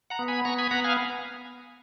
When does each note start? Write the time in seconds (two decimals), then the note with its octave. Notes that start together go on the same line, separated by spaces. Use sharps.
0.10 F#5 A#5
0.19 B3
0.28 G#5 B5
0.45 B3 A#5 C#6
0.58 G#5 B5
0.71 B3 F#5 A#5
0.84 F5 G#5